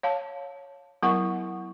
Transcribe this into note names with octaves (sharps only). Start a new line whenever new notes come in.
C#5 F5 A5
F#3 B3 E4 A#4 F#5 C#6